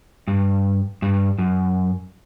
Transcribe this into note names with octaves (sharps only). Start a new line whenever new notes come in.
G2
G2
F#2